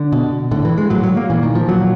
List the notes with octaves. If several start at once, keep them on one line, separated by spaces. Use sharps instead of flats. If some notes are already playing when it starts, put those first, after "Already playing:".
Already playing: D3
B2
A2 D3
E3
G#3
A2 F#3
F#3
A#3
A#2 E3
D#3
F3
A#2 F#3